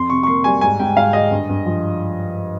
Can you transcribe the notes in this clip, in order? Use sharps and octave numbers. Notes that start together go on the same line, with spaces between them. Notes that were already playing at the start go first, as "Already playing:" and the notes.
Already playing: F2 C6
C3 C#6
C#6
A#3 C6
G3 G#5
G#2 G#5
G#2 G5
G#2 F5
G#2 D#5
G2
G2
F3